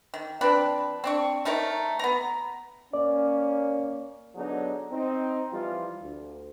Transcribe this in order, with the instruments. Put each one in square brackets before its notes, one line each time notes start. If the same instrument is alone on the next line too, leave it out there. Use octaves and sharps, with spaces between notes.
[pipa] D#3
F3 C4 D4 B4
C4 D4 C#6
A3 D#4 A#4 C#5
B3 A#5
[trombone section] A#3 C#4 [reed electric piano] D5
[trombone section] D3 F#3 B3 D4 D#4 G#4
C4 D#4
E3 F3 G3 E4 F4
D2